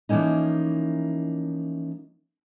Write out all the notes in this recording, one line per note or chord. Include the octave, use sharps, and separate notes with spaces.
E3 F3 A#3 C#4 D#4